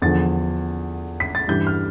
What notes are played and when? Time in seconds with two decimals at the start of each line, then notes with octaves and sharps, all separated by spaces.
0.02 E2 D3 F3 A6
1.20 B6
1.35 A6
1.48 G2 E3 G3 G6
1.67 F6